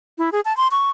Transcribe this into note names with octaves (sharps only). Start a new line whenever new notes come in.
E4
G#4
A5
C6
C#6